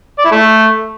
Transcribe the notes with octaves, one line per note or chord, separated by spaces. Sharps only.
D5
E4
A3